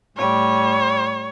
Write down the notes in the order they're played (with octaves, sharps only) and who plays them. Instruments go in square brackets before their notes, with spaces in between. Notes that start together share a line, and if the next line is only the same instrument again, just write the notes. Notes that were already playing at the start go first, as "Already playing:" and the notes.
[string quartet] A2 G3 [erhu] C#5